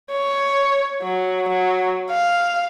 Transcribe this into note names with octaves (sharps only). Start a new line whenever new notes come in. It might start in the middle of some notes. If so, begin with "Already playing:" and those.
C#5
F#3
F#3
F5